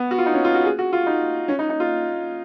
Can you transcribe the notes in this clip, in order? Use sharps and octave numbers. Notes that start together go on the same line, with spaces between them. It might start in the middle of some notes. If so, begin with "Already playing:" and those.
Already playing: B3
F#4
F4
D#4
C#4
F4
F#4
G#4
F#4
F4
D#4
C#4
D#4
D#4
F4